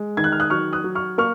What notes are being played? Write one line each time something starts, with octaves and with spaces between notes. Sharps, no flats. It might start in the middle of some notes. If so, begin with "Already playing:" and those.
Already playing: G#3
D#3 G#6
F#6
F6
D#6 F#6
F#3 C#6 F6
D#6 F#6
F#3
C#6 F6
A#3 C#6 F6